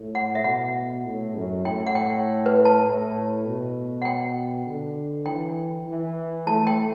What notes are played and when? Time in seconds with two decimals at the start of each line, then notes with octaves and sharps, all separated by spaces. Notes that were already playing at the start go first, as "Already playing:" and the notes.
Already playing: A2
0.15 F#5
0.35 E5
0.44 B2 F#5
1.05 A2
1.35 F#2
1.65 A2 G5
1.87 F#5
1.95 G5
2.46 B4
2.65 A5
2.85 A2
3.46 B2
4.02 F#5
4.05 G5
4.66 D3
5.26 E3 G5
5.87 E3
6.47 A3 A5
6.67 G5